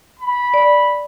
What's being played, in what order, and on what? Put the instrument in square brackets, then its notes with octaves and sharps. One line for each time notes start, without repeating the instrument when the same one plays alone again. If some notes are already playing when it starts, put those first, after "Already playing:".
[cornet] B5
[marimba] D5